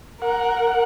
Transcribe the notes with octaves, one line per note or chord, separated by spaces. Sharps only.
A#4 F#5
F#5